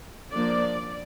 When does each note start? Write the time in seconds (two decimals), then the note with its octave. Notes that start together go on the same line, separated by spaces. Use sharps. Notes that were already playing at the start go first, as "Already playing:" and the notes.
0.33 F3 A#3 D4 D5